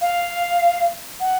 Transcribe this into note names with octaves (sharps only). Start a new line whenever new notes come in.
F5
F#5